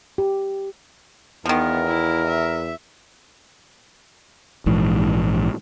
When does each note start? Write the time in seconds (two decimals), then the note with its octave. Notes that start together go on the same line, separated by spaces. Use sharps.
0.18 G4
1.46 E2 D#3 F3 B3 A#4
1.86 E4
2.27 E5
4.66 A#1 G#2 E3